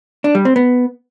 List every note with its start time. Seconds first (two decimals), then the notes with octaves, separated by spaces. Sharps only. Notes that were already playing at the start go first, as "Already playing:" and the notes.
0.24 D4
0.35 G3
0.45 C4
0.56 B3